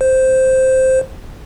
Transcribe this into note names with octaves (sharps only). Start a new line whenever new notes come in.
C5